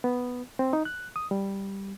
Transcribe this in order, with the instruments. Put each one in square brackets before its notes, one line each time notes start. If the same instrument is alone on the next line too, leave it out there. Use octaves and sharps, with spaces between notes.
[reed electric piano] B3
C4
D#4
F#6
D#6
G3